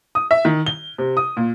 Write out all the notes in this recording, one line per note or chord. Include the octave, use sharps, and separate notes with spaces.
D#6
E5
D#3
G7
C3
D#6
A#2